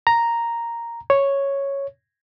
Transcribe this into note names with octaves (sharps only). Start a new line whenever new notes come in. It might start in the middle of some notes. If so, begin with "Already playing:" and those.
A#5
C#5